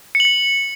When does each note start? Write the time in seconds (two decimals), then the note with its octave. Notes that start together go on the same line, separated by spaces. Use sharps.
0.15 C#7
0.20 F#7
0.25 C#7